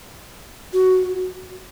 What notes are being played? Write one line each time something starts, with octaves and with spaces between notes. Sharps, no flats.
F#4